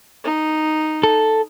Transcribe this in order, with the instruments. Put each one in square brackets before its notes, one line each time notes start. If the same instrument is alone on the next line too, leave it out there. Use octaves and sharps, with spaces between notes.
[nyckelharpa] D#4
[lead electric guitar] A4